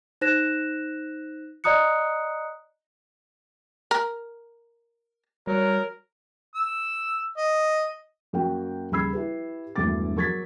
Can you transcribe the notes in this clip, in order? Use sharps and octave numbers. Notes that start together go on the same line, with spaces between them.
D#4 C5 F#6 A#6 E7
D5 D#5 A#5 D#6 F#6 C#7
A#4
F#3 G3 A#4
E6
D#5
F#2 A#3 F#4 G5
D#1 C#3 B5 E6 G#6 C7
E4 G4 B4
E1 D2 G2 E3 D6 A6
F#3 A#4 C#6 G#6 A6 B6